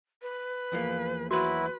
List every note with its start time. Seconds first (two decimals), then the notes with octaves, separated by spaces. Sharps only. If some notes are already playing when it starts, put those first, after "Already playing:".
0.22 B4
0.72 E2 F3 A#3
1.31 F#3 E4 F#4 B4